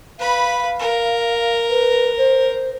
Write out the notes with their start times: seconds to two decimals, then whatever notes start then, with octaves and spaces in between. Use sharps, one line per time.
0.19 B4 F5 B5
0.79 A#4
1.70 B4
2.17 C5